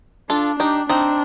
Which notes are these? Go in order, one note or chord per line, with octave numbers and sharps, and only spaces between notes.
D4 F4 A4
D4 D#4 G4
C4 D4 D#4